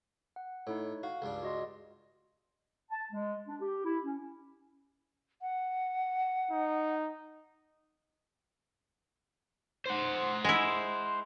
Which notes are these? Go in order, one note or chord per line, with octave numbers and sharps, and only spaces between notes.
F#5
A2 D#4 E4 C#5
F#4 F5
C#2 G2 D4
F#4 D#5 C6
A5
G#3
D4
G4
E4
C#4
F#5
D#4
C5 F#5
G#3 E4